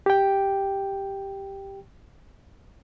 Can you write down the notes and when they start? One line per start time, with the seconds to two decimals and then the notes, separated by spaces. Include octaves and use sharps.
0.06 G4 G5